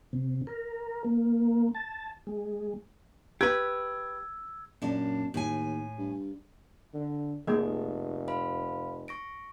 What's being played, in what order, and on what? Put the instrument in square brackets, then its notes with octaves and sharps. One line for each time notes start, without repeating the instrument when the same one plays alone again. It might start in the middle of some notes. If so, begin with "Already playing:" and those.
[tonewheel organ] C3
A#4
A#3
A5
G#3
[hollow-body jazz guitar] G4 B4 [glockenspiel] E6 [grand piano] G#6
[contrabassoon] F#2 [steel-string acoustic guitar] A#2 D4
[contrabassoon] D#2 [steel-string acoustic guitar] A2 G#5
[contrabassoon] G2
[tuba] D3
[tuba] F1 [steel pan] G#3 A#3 [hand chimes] D#5
[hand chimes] C5 F5 B5
C#6 A#6 D7